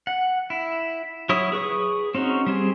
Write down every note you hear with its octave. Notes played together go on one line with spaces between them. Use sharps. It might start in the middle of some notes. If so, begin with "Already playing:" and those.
F#5
E4
F#3 E4 C#5 D#6
G#4 B4 C#6 D#6
C4 C#4 D#4 F#4
G3 C4 G#4